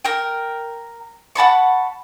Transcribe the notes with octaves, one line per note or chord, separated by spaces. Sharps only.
A#4 G5
F#5 A5 B5 C#6